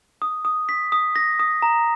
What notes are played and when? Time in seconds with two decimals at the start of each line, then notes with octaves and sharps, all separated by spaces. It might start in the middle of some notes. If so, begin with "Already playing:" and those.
0.22 D#6
0.45 D#6
0.69 B6
0.92 D#6
1.16 A#6
1.39 D#6
1.62 A#5